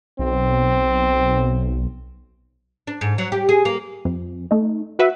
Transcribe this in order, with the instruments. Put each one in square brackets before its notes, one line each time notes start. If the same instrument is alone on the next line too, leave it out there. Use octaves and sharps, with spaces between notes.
[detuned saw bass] B1 [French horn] C4
[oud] D4
G#2
F#3
G4
G#4
A#3
[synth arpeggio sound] F2
A3 D#4
F#4 B4 E5 F#5